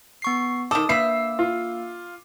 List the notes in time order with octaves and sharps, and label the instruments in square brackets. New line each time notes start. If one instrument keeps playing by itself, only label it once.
[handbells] B3 C#6 C7
[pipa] D#3 A4 [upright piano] D6 [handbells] D#6
[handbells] A#3 E6 [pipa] D4 B4 E5 [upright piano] C7
[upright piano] F4